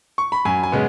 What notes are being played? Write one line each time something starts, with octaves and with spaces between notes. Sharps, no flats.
C#6
B5
F#2 G#5
G#5
C#3 G#3 B3